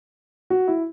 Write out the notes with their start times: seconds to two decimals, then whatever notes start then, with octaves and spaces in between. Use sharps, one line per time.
0.50 F#4
0.68 E4